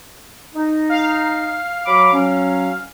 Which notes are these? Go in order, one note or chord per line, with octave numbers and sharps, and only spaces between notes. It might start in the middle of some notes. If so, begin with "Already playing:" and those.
D#4
F5
F#3 B5 D6
F#3 C#4